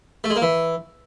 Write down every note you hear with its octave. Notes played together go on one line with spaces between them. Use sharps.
A3
G#3
A#3
E3